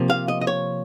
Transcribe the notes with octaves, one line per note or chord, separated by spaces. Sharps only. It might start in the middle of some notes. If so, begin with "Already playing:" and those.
Already playing: C3 F3 A#3
F5
D#5
D#5
C#5